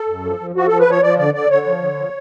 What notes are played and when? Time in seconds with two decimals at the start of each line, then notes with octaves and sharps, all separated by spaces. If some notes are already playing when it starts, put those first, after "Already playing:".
Already playing: A4
0.08 F#2
0.25 F3
0.40 F3
0.56 F3 F#4
0.68 F3 A4
0.80 B4
0.87 F3 C#5
1.03 F3 D5
1.18 D3 D5
1.34 D3 D5
1.50 D3 C#5
1.66 F3
1.81 D3
1.97 F3